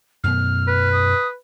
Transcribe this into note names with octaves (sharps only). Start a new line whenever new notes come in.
F#2 B2 B3 F6
B4
D#6